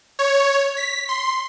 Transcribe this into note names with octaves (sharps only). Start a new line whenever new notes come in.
C#5
B6
C6